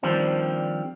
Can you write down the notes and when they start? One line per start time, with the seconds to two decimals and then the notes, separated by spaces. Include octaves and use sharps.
0.03 D#3 F3 G3 C4 D4